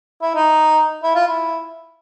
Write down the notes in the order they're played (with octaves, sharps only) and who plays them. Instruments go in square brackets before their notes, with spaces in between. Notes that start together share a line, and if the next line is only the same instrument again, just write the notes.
[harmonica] E4
D#4
E4
F4
E4